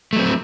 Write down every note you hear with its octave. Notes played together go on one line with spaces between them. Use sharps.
F#3 A3 C4